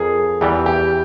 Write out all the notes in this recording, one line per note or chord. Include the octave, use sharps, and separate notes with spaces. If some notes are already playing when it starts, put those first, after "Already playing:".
Already playing: F2 G#4 A#4
E2 E3 G3 G4
G4